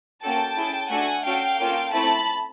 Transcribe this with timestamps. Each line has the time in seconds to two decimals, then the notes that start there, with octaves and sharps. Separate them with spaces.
0.23 A#3 C#4 F#4 A4 G5 A5
0.57 C#4 E4 G#4
0.91 A3 D4 F#4 A4 F#5 G#5
1.25 C#4 F#4 A4 F5 G5
1.59 A#3 C#4 F4 A4
1.93 A3 C4 E4 A5 B5